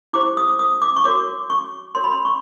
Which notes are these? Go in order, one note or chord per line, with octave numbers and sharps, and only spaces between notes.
E4 G4 C5 D6
D#6
D#6
D6
C#6
F#4 A#4 C#5 D6
C#6
F#4 A#4 C#5 C6
B5
C6
C#6